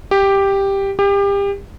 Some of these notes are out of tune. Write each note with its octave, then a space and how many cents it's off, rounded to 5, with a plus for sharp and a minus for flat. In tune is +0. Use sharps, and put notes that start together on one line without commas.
G4 +5
G4 +30